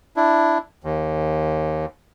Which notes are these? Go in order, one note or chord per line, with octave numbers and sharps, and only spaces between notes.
D4 E4
D#2